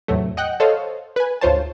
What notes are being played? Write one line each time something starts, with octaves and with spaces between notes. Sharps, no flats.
E2 A2 C3 F#3 A3
D#5 F#5 G5 F#6
A4 C5 C#5 D#5 F5
B4 G#5
D2 G#2 F4 C5 C#5 A5